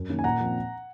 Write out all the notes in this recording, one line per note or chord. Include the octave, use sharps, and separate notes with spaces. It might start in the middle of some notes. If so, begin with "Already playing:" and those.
Already playing: F#2
D#3 A#3 C#4
G#5
A#2 F#5 A#5
F3 C4